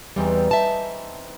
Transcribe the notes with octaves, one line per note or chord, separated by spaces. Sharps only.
E2 E3 G3 C4 D#4
E5 A5